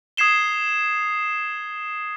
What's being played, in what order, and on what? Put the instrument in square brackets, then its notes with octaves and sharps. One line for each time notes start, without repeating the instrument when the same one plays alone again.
[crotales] D#6 G#6 C7 E7 G7